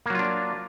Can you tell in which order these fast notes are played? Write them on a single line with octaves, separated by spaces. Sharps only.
A#3 F#3 F4 D4